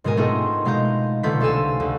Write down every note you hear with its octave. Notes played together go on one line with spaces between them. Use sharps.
G#2 B2 G#3 A#4 G#5
A3 B3 C4 D#4 F4 G#4
B2 G#3 F5 A#5 G6
B2 D3 A3 F4 G6 B6
C2 A4 F5 G#5 E6
D2